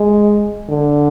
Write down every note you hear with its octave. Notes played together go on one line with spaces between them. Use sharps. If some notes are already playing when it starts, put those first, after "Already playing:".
Already playing: G#3
D3